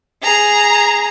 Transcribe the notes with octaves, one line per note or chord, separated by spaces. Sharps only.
G#4 A#5